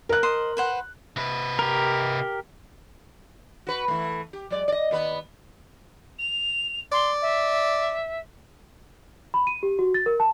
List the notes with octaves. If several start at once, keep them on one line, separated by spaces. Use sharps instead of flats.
A#4 F#6
C5 D#5 C6
B4 C5 F#5
C3 B4
G4 A#4
F#4 B4
E3 A3
G4
F#3 G#3 D5
D5 D#5
D#2 B3 B4
F7
D5 C6
E5
B5
D#7
G4
F#4
A6
A#4
A5